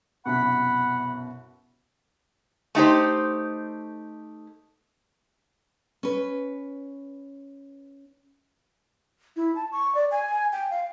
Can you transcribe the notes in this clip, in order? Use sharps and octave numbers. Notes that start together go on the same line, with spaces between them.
C2 F#2 B2 F#5 B5
A3 D#4 G4 C5
C#4 B4
E4
A5
C#6
D5
G#5
G5
F5